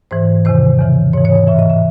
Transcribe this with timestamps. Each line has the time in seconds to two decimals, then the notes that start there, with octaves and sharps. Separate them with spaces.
0.11 G#2 E3 C5
0.45 E2 C3 D#3 C5
0.79 E2 C#3 E3
1.13 G#2 C#5
1.17 E3
1.25 C#5
1.47 A2 E3 E5
1.59 D#5
1.70 E5